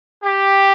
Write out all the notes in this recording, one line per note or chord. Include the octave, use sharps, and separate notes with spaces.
G4